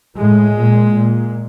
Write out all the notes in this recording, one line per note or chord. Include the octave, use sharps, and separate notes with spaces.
A2 G#3
A#2
A#2